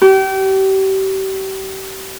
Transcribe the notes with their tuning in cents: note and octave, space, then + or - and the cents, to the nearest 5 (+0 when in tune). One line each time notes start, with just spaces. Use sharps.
G4 -35